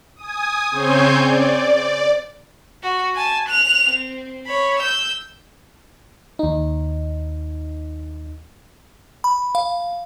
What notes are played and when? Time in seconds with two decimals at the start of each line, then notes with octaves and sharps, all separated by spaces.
0.16 G#5 D#6
0.71 C#3 C4 C5 C#5 G#5 G6
1.18 D5
2.83 F#4
3.16 G#5 A5
3.48 F#6 F7
3.90 C4
4.46 C#5 B5
4.80 E6 G6
6.39 D#2 D#4
9.24 B5
9.55 F5